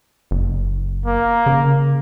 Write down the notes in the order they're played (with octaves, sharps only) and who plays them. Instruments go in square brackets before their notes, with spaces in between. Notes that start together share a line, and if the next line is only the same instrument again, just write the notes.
[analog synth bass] F#1
[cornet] A#3
[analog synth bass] C#3